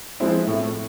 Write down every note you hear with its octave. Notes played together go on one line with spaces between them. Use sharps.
F3 G#3 C4 E4
A2